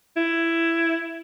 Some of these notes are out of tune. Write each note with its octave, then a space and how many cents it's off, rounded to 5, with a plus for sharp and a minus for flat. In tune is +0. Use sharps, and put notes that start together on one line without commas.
E4 +10